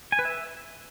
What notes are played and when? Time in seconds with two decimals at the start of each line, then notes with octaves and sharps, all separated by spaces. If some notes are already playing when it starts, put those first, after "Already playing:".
0.12 G#5
0.19 B4
0.25 E5